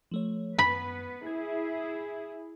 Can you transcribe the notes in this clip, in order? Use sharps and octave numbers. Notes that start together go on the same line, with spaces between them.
F3 A3 C#5
F#2 B3 B4 B5
E4 G#4 G#6